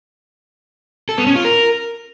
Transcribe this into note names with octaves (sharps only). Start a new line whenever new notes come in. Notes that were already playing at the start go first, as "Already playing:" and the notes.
A4
B3
C#4
F4
A#4